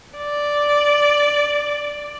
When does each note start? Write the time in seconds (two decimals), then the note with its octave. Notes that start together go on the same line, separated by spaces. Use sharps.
0.18 D5